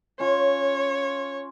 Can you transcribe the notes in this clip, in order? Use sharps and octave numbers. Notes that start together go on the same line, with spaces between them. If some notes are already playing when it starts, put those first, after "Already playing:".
C#4 F4 C#5